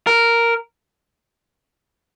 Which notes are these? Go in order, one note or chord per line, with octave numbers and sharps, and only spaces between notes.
A#4